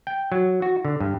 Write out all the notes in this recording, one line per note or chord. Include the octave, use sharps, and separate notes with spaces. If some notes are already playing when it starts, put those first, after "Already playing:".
G5
F#3
F#4
D3
G2